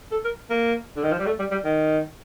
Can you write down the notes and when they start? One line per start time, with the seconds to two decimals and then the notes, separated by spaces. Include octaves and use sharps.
0.11 A4
0.25 A#4
0.50 A#3
0.97 D3
1.04 D#3
1.11 F3
1.19 G3
1.26 A3
1.39 G3
1.51 G3
1.64 D#3